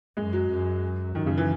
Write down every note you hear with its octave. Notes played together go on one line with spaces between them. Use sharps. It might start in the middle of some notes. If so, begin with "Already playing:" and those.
F#2 G#3
F#3
F#2
F#2 D#3
C#3
E3